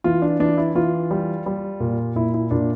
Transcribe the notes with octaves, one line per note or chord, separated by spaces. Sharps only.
E3 F4
D4
E3 D4
E4
E3 F4
G3
G3
A#2
A#2 E4
E4
A#2 D4